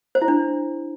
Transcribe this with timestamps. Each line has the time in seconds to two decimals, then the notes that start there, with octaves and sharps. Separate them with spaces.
0.15 C5
0.22 E4
0.28 D4